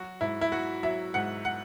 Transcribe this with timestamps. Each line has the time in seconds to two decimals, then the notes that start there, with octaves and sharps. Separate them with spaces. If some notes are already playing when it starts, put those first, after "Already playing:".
Already playing: F#3 F#4
0.21 G#2 E4
0.41 E4
0.52 F#3 F#4
0.83 F#3 E5
1.14 G#2 F#5
1.45 F#5